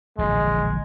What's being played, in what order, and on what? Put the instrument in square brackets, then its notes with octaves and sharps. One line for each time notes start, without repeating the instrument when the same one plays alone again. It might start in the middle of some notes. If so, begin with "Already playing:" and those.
[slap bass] D1 A#1 E3 [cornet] G#3